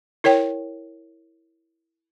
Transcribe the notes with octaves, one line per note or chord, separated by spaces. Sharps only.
E4 A#4 C#5 G5